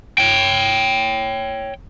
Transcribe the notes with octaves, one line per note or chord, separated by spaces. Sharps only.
C#5 G5